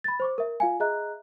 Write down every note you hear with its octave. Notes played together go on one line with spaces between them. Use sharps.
B5 A6
C5 C#6 D6
A#4 E5
F4 F5 G#5
G#4 D#5 E5 A#5 F#6